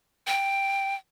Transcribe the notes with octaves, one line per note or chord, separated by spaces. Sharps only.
G5